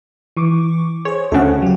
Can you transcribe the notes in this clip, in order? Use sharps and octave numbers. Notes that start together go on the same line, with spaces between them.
E3 C#6 D6
G#4 C5 C#5
D2 C#3 A4 F#5
F#3 G4